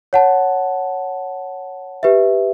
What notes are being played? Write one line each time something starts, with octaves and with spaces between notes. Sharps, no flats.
C#5 F#5 A5
G4 B4 E5